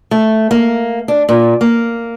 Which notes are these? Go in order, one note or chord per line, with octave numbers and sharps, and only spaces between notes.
A3
A#3
D4
A#2
A#3